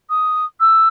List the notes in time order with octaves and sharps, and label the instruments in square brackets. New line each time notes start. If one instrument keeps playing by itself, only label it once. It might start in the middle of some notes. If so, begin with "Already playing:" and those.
[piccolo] D#6
E6